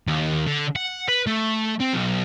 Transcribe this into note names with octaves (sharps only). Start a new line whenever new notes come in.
D#2
D3
F#5
B4
A3
C4
B1